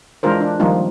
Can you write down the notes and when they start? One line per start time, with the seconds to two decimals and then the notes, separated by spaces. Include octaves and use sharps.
0.23 E3 G#3 D4 F4 A#4 C5
0.41 D4
0.60 D#3 F3 G3 A#3 D#4 F4